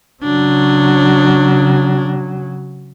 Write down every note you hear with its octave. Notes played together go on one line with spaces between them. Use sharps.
C#3 F#3 D4